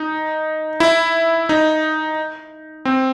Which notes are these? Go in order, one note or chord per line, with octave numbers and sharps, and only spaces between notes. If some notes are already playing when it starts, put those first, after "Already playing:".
Already playing: D#4
E4
D#4
C4